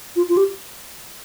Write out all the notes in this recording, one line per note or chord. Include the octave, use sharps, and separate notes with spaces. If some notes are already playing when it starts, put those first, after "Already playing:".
F4
F4
G4